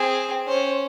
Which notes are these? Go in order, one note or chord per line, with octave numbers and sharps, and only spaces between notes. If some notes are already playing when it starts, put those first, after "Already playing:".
Already playing: C4 G#4
C#4 C5